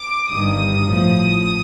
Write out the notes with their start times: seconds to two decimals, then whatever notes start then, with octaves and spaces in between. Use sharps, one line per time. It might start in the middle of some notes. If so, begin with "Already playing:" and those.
Already playing: D6
0.30 G1 G2 D#3 G3 D#6
0.85 A1 A2 F3